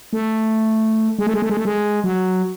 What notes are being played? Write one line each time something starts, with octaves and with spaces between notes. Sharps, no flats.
A3
G#3
A3
G#3
A3
G#3
A3
G#3
F#3